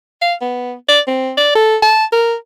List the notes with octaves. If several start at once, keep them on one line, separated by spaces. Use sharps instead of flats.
F5
B3
D5
C4
D5
A4
A5
A#4